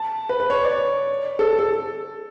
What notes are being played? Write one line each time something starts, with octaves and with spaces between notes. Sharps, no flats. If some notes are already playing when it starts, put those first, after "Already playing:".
Already playing: A5
B4
B4
C#5
D5
A4
A4